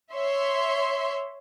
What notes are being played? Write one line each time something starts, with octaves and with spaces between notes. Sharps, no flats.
C#5 E5 C6